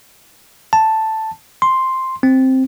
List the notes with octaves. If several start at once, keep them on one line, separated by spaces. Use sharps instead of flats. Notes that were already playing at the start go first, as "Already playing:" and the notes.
A5
C6
C4